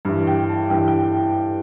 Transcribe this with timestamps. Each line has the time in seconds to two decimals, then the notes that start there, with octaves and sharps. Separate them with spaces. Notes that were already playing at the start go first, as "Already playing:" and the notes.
0.05 G2 E3
0.27 G5
0.49 A5
0.70 G2 E3 G5
0.88 G5